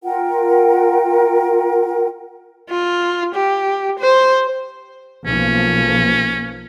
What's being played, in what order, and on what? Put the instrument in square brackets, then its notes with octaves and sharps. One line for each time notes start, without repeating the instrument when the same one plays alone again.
[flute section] F4 A#4 F#5 G5
[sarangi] F4
G4
C5
[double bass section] B1 F3 A#3 [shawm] C#4